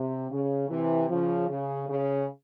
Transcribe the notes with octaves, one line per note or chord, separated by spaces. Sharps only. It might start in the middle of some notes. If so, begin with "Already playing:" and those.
Already playing: C3
C#3
C3 E3
C#3 F3
C#3
C#3